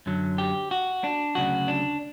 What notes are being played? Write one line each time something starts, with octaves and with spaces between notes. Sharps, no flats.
F#2 D3 F#3
G4
F#4
D4
D2 C#3 F#3 F#4
D4